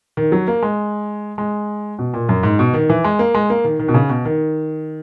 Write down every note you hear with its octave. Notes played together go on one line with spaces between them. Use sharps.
D#3
F#3
A#3
G#3
G#3
B2
A#2
F#2
G#2
B2
D#3
E3
G#3
A#3
G#3
A#3
D#3
D#3
B2
C#3
B2
D#3